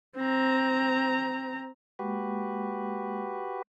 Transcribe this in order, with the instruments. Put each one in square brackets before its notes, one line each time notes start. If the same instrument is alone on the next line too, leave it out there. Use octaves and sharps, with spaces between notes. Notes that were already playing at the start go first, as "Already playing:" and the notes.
[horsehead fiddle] C4 A#5
[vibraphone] G#3 A#3 [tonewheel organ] F#4 G4 B4